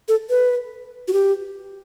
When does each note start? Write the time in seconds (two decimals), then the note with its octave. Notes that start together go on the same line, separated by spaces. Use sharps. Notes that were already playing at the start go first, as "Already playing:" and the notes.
0.08 A4
0.30 B4
1.08 F#4
1.13 G4